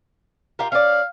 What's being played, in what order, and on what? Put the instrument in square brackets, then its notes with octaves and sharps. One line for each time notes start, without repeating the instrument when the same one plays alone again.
[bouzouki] F4 G4 A#4
[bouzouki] C#4 D5 [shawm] F5